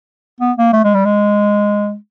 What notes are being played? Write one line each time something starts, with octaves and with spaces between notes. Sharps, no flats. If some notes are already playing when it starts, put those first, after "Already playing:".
B3
A#3
A3
G#3
G3
G#3